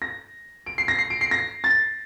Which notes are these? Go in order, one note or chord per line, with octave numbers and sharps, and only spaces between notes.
A#6
D7
C7
A#6
C7
D7
C7
A#6
A6